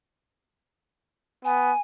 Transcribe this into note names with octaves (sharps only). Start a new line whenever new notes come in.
B3 G#5